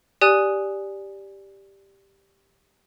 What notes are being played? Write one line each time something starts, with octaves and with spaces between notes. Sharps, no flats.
G4 D5 G#5 D#6 F#6 D#7